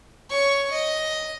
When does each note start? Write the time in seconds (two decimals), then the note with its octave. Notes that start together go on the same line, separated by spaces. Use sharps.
0.30 C#5 C#6
0.72 D#5